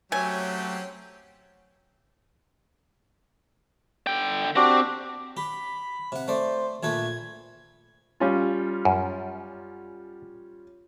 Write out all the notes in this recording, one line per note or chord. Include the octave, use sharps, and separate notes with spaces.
F#3 A3 C4 C#4 G4 G#5
D3 G5
C4 D4 F#4 G4
G4 B5
C3 F#5
A3 C5 D5
A#1 A3 B4 G#6
G3 C#4 F4
F#2